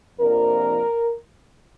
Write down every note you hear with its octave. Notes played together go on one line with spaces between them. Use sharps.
F2 C3 F3 A#3 D4 A#4